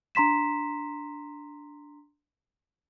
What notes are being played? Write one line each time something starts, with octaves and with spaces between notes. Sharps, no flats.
D4 A#5 C6 B6 E7